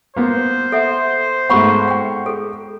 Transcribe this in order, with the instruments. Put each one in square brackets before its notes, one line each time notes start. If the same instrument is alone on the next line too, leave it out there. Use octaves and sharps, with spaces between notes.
[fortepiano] A#3 B3 [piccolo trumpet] C5
[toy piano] A4 E5 F#5
[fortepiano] G#2 A3 B3 [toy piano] F#5 B5 C#6
[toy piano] F#5 G5
G#4 A4